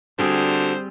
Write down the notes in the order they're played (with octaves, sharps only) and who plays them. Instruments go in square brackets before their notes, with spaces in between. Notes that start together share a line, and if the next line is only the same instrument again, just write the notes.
[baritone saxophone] D3 [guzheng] G3 C4 G#4 [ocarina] F#4 [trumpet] C5